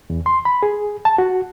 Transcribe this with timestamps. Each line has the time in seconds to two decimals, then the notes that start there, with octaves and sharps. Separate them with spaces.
0.10 E2
0.26 C6
0.45 B5
0.63 G#4
1.05 A5
1.18 F#4